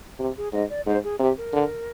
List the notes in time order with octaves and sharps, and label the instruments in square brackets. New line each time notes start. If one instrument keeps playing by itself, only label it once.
[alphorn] C3 [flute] G4
[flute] G#4
[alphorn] G#2 [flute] D#5
[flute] D5
[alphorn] G#2 [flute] C5
[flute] G#4
[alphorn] C3 [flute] G4
[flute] A#4
[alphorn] D3